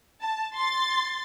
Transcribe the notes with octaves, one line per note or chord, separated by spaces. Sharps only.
A5
C6 A6